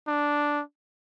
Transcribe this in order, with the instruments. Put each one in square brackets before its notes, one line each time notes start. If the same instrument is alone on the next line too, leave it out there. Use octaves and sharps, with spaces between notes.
[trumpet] D4